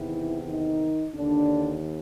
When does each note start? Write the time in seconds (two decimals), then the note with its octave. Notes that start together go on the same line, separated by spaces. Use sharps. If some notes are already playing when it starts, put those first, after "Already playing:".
Already playing: E2 C3 D#3 E3 E4
0.44 D#3 D#4
1.15 D#2 D3 D#3 D4